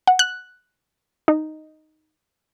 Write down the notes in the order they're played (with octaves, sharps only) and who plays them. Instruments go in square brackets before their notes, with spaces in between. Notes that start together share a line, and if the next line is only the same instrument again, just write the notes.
[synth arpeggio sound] F#5
F#6
D#4